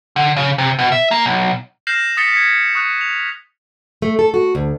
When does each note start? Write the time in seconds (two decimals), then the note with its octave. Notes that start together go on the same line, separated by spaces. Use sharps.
0.16 D3
0.37 C#3
0.58 C3
0.79 B2
0.92 E5
1.11 A#3
1.26 B1
1.87 F6 G6 A#6 C7 E7 F#7
2.17 D#6 A6 B6 C#7 G7
2.32 G#6 A#6 B6 C#7
2.50 C#7
2.75 C#6 D#6 F#6
3.01 F7
4.02 A3
4.19 A4
4.34 F#4
4.55 D2